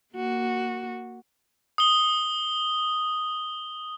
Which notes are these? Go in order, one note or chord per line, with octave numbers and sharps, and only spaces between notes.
A#3 F#4
D#6 G7